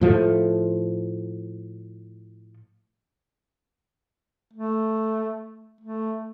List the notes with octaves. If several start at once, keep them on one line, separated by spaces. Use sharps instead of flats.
A2 F3 A3
A3
A3